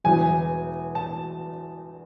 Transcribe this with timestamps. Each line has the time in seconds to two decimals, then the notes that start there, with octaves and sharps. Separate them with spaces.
0.04 E1 E2 B2 F#3 G#5
0.95 A5